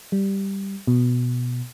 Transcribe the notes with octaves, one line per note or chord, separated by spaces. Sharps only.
G3
B2